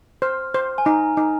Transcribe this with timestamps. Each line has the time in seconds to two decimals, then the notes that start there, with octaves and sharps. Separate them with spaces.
0.22 C5 F6
0.54 C5
0.78 G#5
0.85 D#4 A#5
1.17 D#4